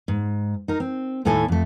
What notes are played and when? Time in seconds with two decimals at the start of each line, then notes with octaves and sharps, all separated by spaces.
0.08 G#2
0.68 D#4 A#4
0.80 C4
1.25 D#2 A2 E4 A4 G#5
1.48 F2 A3